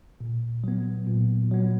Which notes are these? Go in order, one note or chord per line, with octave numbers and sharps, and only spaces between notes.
A#2
F#3 B3
A#2
F#3 B3